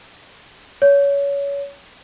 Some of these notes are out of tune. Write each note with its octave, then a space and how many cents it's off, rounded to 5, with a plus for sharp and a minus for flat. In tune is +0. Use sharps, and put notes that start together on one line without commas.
C#5 +25